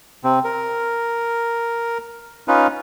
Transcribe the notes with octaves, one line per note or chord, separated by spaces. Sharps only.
C3 C4
A#4
C#4 D#4 F4 B4